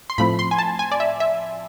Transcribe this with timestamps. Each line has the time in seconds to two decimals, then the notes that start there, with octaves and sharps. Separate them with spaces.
0.10 C6
0.18 A2 F3 A3 C4 B5
0.39 C6
0.51 G#5
0.58 A5
0.79 G#5
0.92 D5
1.00 E5
1.20 E5